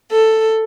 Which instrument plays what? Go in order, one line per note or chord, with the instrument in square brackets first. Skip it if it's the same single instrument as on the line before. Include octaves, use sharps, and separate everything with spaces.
[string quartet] A4